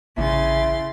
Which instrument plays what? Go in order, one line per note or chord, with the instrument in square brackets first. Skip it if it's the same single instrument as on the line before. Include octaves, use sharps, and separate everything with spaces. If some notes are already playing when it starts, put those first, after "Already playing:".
[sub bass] A1 [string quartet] C#3 C6 A6 [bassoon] E4